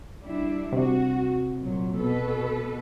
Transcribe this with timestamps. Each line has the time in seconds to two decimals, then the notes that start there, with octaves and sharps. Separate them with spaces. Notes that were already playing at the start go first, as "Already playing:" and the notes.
0.20 G3 D4 E4
0.72 C3 F#4
1.60 A#2 F#3
1.96 B2 A4 B4